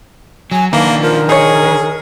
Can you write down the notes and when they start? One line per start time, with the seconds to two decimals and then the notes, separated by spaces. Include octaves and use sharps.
0.52 F#3 G#5
0.73 D#3 E3 A#3 D4 F5
1.02 F3 A#4
1.29 D#4 G#4 C#5